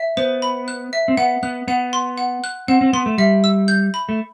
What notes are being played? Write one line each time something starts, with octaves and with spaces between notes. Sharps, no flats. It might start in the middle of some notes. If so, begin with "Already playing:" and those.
Already playing: E5
B3 C5
B5
F#6
E5
C4
B3 F#5
B3 F#6
B3 F#5
C6
F#5
F#6
C4 F#5
C4
B3 C6
A3
G3 E5
E6
G6
B5
A3